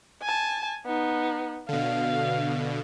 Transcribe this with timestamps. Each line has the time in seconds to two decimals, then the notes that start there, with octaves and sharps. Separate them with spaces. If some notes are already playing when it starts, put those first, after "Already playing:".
0.22 G#5 A5
0.86 B3 D#4
1.69 B2 D3 F5